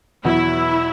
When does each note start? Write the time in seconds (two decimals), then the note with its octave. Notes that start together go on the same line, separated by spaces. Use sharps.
0.25 E2 B2 F#3 B3 E4 F#4